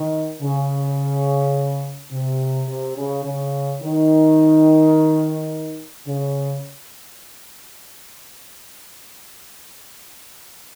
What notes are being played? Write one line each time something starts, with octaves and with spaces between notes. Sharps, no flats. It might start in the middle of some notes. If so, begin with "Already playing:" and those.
Already playing: D#3
C#3
C3
C3
C#3
C#3
D#3
C#3